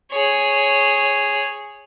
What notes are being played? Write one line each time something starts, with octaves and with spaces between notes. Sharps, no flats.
G#4 C#5